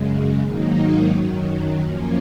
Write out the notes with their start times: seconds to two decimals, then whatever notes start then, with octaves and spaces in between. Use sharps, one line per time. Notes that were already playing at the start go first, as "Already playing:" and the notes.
Already playing: F#2 C#3 G#3
0.39 G#2 D#3 F#3 A#3 D#4
1.09 F#2 D#3 F#3
1.79 F#2 F3 A#3 C#4